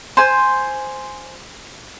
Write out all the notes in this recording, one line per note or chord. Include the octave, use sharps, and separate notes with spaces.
C5 G#5